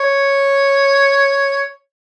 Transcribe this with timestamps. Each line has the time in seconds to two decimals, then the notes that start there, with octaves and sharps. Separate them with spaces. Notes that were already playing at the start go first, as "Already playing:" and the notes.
Already playing: C#5